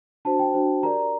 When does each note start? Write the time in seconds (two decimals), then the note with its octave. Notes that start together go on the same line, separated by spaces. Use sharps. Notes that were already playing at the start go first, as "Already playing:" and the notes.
0.25 D4 F#4 C5 A5
0.39 G5
0.54 D4 F#4 C5
0.83 G4 A#4 D5 A#5